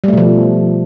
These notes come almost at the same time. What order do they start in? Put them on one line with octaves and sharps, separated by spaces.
G3 A3 B2 F3